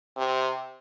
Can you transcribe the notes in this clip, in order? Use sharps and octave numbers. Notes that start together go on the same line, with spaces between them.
C3